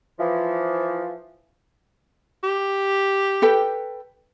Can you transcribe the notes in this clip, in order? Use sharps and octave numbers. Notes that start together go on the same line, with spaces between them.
E3 F3
G4
A4 B4 G5